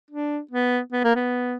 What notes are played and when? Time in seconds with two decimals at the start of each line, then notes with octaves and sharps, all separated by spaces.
0.11 D4
0.51 B3
0.92 B3
1.04 A#3
1.16 B3